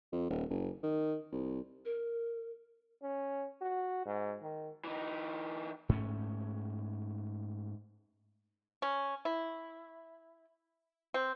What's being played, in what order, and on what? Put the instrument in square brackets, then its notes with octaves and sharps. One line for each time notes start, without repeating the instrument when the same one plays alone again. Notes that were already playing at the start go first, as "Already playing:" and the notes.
[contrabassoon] F2
D#1
F#1
D#3
C2
[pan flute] A#4
[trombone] C#4
F#4
G#2
D#3
[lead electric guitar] E3 D#4
[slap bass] G#2 A3 C#4
[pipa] C#4
E4
C4